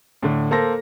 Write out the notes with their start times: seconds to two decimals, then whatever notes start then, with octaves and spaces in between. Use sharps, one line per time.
0.23 A2 D3
0.51 A#3 A4 C5 A#6